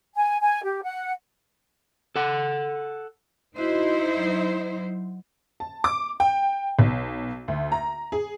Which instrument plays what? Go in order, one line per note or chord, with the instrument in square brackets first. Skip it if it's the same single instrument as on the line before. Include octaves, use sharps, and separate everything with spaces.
[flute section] G#5
G#5
G4
F#5
[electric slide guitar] A4 F#5
[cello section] D#4 E4 C5 [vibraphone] F#4 D#5
[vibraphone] F#3
[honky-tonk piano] A5
D6
G5
B1
D2
A#5
G#4